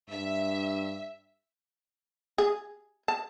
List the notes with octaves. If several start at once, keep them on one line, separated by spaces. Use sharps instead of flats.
G2 E5
G#4
A5